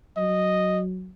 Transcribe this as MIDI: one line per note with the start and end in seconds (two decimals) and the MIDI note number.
0.17 1.12 54
0.17 0.81 75